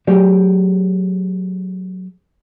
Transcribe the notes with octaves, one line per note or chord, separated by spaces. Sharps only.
F#3 A3 G4 G#4 C5 D5